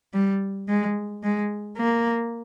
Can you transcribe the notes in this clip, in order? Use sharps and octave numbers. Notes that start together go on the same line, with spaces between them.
G3
G#3
G#3
A#3